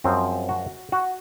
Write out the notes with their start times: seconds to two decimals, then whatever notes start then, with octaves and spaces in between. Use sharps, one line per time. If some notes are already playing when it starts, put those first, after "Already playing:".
0.04 F#2 F3 G#3 C4
0.49 F#4
0.92 F#4